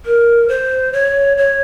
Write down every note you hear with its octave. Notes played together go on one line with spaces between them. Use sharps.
A#4
C5
C#5
C#5